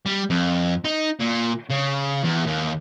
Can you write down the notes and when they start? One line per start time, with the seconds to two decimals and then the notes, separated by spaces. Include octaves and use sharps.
0.06 G3
0.30 F2
0.84 D#4
1.19 A#2
1.70 C#3
2.23 E2
2.46 D#2